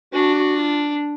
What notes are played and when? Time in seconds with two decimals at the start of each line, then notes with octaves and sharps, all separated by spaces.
0.13 D4 F#4
0.35 F#4
0.57 F4